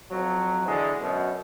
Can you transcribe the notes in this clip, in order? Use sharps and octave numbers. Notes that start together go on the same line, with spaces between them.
F2 F#3
D3 E3 G#3
F#2 B2